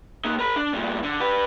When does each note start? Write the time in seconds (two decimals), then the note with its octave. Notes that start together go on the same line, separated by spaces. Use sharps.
0.25 A#3 D#4
0.39 A#4 B5
0.56 D4
0.73 G2 A#2
1.03 D3
1.20 G4 B4